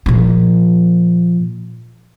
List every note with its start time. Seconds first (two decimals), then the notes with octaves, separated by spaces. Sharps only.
0.06 A#2 F3